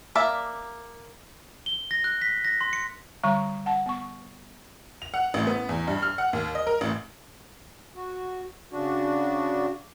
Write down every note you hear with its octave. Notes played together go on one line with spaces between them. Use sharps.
A#3 D5 E5 A5
G7
A#6
F#6
B6
A#6
C6
C#7
D3 G3 A#5 C#6
F#5 A5
B3 C#6
F7
F#5
A1
B3
E2
G2
F6
F#5
D#2
D#5
A#4
A1
F#4
C#3 D4 F#4